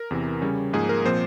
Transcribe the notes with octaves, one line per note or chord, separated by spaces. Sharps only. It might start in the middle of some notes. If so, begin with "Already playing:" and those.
Already playing: A#4
E2 C3 E3
C#3 G3 C#4
G#2 F3 A#3 G#4
A#4
A#2 F3 C4 C5